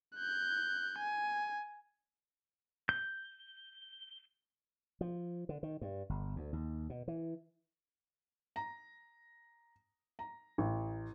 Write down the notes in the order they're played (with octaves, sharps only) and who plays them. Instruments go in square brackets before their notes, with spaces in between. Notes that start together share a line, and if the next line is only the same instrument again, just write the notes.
[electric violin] F#6 G6
G#5
[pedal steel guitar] G6
[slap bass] F3
D3
D#3
G2
G1
D2
D#2
B2
E3
[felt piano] A#5
A#5
A1